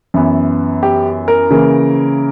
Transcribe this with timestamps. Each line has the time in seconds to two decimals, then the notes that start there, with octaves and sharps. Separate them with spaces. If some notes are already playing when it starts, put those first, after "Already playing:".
0.14 F#2 E3 B3
0.83 G4
1.28 A#4
1.51 C#3 E3 A#3